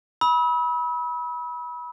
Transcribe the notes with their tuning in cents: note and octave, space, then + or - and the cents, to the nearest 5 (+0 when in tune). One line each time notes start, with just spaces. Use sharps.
B5 -25 E6 -40